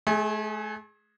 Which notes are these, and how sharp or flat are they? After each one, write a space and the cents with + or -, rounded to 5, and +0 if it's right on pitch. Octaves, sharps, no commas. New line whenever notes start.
A3 -40 G#4 +0